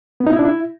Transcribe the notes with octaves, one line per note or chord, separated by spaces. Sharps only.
B3
D#4
E4
D4
E4